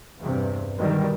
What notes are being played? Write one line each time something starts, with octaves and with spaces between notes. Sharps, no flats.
E2 G2 C3
G#2 B2 D3 D#3 F#3 G3